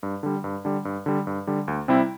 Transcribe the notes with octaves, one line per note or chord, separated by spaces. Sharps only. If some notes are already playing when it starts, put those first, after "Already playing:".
G2
D3 G3
G2
D3 G3
G2
D3 G3
G2
D3 G3
D2
C3 G3 C4 E4